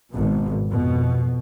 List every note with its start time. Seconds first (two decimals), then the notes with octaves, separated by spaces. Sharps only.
0.12 G#1 B2
0.67 F2 B2